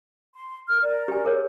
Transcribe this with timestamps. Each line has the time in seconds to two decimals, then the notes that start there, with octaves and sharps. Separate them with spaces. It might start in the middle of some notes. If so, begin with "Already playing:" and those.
0.34 C6
0.69 A#4 F6
0.82 A#4 D5
1.08 G4 G#5
1.25 G#4 A#4 C#5